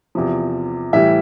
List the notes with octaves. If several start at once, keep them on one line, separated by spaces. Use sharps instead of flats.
E2 C3 F3
A2 E3 G3 E5